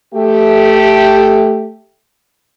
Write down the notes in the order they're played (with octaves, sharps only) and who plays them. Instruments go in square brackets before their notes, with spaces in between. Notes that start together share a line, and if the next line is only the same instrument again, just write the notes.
[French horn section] A3 G4